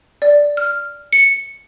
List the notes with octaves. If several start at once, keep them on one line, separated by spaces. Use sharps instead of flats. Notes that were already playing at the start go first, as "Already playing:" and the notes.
D5
F6
C#7